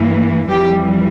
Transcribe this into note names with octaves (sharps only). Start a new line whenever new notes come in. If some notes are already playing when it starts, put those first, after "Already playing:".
Already playing: G2 E3 A#3
F2 E3 G3 G4